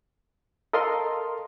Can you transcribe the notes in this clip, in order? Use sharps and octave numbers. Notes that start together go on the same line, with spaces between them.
A4 A#4 D#5 F5 C6